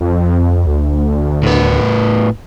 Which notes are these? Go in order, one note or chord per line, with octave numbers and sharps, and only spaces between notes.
F2
D2
A2 B3